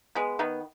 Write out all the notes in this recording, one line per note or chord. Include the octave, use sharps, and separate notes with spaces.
G#3 B3
D#3 B3